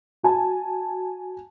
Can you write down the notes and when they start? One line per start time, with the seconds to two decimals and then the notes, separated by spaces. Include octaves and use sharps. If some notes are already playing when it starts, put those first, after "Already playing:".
0.23 F#4 G#5 A5